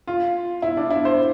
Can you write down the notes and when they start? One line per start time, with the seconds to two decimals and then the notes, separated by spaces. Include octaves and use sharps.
0.07 F4
0.62 E4
0.77 D4
0.90 E4
1.05 C5